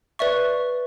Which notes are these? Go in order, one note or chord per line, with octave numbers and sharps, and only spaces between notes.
B4 D5 E5 C#6